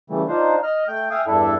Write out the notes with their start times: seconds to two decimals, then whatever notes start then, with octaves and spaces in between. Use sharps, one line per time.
0.10 C#3 E3 G3 A3
0.28 D4 D#4 F4 C5
0.63 D#5 F6
0.88 A3 G5 G6
1.11 E5 F5 G5 G#5 D#6
1.27 E2 G2 D4 E4 A4 E5